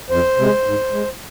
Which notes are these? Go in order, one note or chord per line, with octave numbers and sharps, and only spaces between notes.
F2 C5
C3 G#3
G#2
G#3